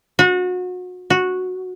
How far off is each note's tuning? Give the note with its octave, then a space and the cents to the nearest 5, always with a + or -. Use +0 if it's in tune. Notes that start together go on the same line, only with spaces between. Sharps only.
F#4 -30
F#4 -10